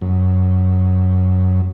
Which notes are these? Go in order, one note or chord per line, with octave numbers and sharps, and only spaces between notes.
F#2